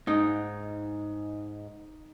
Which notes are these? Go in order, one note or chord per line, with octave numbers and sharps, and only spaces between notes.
G#2 D#4